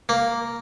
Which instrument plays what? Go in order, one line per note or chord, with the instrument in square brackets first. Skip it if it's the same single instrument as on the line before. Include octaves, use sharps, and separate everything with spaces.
[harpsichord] A#3